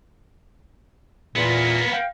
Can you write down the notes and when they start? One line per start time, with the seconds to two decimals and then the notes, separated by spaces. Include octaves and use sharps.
1.36 E2 A#2 A#3 B3
1.92 F5 G5